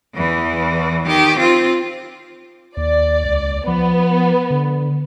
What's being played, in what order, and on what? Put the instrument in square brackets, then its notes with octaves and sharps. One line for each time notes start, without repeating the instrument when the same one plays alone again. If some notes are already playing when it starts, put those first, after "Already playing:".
[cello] E2 E3
D#3 G4
C4 F4
[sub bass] D#2 [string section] D5
[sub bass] C#2
[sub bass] F3 [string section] B3
[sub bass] D3